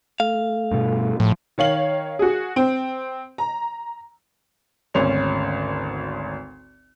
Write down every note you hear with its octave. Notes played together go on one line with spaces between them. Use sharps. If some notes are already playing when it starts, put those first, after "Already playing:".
A3 F5
G2 B2
A2 F3
D#3 C#5 F5 F#7
F#4 G#4
C4
A#5
G#1 D2 C#4 F7